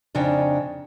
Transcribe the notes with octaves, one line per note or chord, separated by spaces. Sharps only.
F2 C#3 D4 D#4 G5